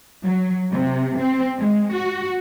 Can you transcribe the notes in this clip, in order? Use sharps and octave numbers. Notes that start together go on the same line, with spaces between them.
F#3
C3
C4
G#3
F#4